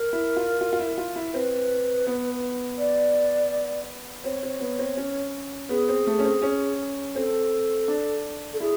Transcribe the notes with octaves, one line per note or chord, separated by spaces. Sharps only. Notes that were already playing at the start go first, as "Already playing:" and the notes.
Already playing: A#4
E4
F4
F4
F4
E4
F4
E4
C4 B4
B3
D5
C4 C#5
C4
B3
C4
C#4
B3 G#4
C4
A3
C#4
C4
C#4
C4 A4
D4
A4
E4 G#4